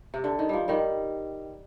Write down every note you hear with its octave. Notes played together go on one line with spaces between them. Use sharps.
C3
D3
D#3
F3 G3
D#3 G3